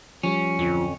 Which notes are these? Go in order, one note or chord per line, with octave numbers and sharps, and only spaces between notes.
F3 G3 C#4
D1 F2 F3